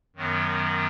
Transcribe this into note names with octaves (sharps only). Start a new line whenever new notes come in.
F#2 D#3 F#3 B3